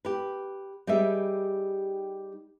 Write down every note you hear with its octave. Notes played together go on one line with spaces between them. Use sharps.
G4 B4
G3 D#4 G4 G#4 B4 E5